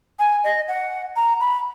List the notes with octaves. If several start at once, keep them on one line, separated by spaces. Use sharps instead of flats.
G#5
D#5
F#5
A#5
B5